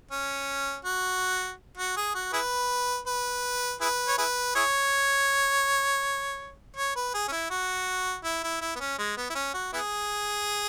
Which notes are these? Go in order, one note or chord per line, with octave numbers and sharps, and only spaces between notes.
C#4
F#4
F#4
G#4
F#4
E4 G#4 B4
B4
E4 G#4 B4
C#5
E4 G#4 B4
E4 G#4 C#5
C#5
B4
G#4
C#4
E4
F#4
E4
E4
E4
B3
C#4
G#3
B3
E4
C#4
F#4
B3 E4 G#4